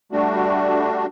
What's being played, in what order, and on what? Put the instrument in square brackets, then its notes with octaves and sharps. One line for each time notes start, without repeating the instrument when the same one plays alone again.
[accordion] G3 A3 D4 F#4